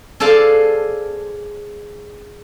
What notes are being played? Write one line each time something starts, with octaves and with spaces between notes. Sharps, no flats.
G#4 A4 C5 D5 F5 A5